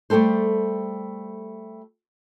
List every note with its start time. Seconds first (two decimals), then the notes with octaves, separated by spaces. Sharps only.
0.10 G3 A3 G4 A4 C5